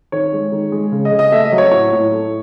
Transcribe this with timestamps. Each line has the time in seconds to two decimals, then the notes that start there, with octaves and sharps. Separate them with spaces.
0.12 D#3 C#5
0.32 G#3
0.52 D#3
0.72 G#3
0.92 C#3
1.05 D#5
1.12 C#3
1.19 D#5
1.32 A3 E5
1.45 D#5
1.52 F#3
1.58 C#5
1.71 A2 C#5
1.92 A2
2.12 A3